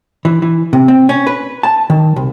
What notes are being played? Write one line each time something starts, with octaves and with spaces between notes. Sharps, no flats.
E3
E3
C3
C4
C#4
B4
A5
D#3
C2